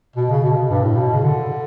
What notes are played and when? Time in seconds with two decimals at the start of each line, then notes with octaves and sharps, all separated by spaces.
0.16 B2
0.30 C#3
0.43 B2
0.52 C#3
0.57 B2
0.71 G2
0.84 A2
0.97 B2
1.14 C#3
1.24 D3